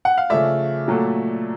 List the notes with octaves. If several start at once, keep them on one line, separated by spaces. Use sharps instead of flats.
F#5
F5
C#3 F3 A3 D5 E5
A#2 F#3 A3